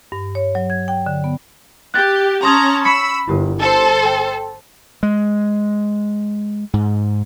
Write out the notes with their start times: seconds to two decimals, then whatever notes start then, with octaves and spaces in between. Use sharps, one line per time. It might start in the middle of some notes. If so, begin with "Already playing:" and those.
0.12 G2
0.35 C#5
0.55 F#3
0.70 G#6
0.88 G5
1.06 D3
1.24 B3
1.94 G4 F#6 A6
2.43 C#4 A5 A#5 C6 D#6 G#6
2.85 B5 C#6 E6 B6 C#7
3.28 G1 E4 G4 A#4
3.60 A4 C5
4.05 G5
5.03 G#3
6.73 G#2